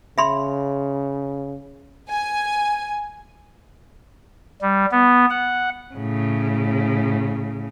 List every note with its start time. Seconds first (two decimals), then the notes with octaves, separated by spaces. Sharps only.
0.18 C#3 E5 B5 C6
2.09 G#5
4.61 G3
4.92 B3
5.30 F#5
5.95 A2 C#3